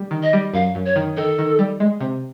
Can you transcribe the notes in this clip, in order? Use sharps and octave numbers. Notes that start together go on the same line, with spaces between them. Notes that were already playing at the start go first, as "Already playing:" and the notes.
Already playing: G3
D#3
D#5
G3
F#2 F5
F#2
C#5
D#3
D#3 A4
D#3
G3
G#3
C3